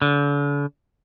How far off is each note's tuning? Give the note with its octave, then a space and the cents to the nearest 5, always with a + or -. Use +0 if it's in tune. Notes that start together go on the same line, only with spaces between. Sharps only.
D3 -40